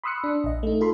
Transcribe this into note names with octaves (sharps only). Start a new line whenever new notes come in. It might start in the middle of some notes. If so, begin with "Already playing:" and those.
B5 C6 D#6 E6 F#6 C#7
D4
A#1 D#5
A3 D#4
F4 A4 B5 C6